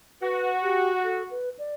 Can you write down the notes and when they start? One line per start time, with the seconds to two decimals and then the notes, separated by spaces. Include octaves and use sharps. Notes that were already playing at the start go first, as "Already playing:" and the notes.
0.22 F#4 B4
0.62 G4
1.04 A4
1.31 B4
1.59 D5